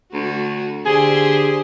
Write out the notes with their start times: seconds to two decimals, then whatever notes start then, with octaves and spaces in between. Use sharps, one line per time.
0.13 D2 F#4
0.85 D3 G4 G#4 C5